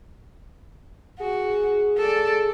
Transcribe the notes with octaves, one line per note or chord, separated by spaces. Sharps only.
F#4 G#4
A4 D5